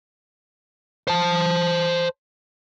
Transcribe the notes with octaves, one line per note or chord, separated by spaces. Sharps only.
C5 A5